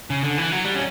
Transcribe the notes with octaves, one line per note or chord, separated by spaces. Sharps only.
C#3
D3
E3
F#3
G3
C#4